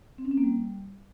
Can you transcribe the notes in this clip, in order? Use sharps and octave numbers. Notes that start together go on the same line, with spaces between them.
C4
C#4
C4
A#3
G3